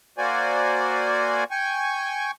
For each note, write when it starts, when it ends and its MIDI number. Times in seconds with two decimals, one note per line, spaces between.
0.18 1.44 58
0.18 1.44 66
0.18 1.44 72
0.18 1.44 74
0.18 1.44 80
1.51 2.31 79
1.51 2.31 80
1.51 2.31 85